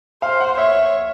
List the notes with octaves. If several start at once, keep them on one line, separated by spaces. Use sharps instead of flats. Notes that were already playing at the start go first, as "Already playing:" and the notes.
C5 F5
F#5
C#5 E5